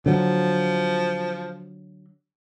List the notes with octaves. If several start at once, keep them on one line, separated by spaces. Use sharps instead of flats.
D3 F3 F#3